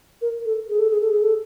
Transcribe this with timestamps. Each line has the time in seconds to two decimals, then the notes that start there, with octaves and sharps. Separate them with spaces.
0.22 A#4
0.45 A4
0.69 G#4
0.79 A4
0.90 G#4
1.01 A4
1.11 G#4
1.22 A4